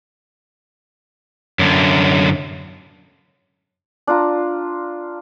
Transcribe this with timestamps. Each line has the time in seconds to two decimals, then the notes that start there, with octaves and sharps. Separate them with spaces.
1.59 F#2 D3
4.07 D4 F4 A#5